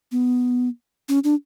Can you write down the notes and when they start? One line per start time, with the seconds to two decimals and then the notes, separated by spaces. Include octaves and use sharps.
0.12 B3
1.09 C#4
1.24 D4